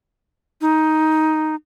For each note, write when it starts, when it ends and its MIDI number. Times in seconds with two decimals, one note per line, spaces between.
0.61 1.55 63